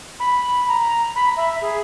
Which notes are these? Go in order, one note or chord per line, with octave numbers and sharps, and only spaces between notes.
B5
A#5
B5
E5
G#4